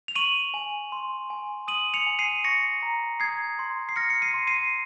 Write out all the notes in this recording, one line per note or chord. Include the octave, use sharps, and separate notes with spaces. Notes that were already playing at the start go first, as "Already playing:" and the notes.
F7
C#6 D#7 F#7
G#5
C6
G#5
D#6 D#7 F#7
C#7 F7
G#5
C7 D#7
C#6 A#6 C#7
A#5
D#6 G#6 C7
C6
C7
F6 A#6 C#7
C#7
C7 D#7
C6
C7 D#7